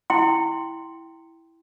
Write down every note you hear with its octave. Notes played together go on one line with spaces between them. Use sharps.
E4 G5 C6